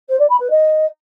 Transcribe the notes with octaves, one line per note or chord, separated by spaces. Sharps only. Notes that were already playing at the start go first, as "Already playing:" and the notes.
C5
D5
B5
B4
D#5